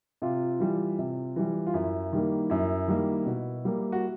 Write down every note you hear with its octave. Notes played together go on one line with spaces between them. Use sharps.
C3 F4
E3 G3
C3
E3 G3
F4
F#2 E4
D#3 G3 A#3
F#2 E4
D#3 G3 A#3
B2
G3 A#3
F#4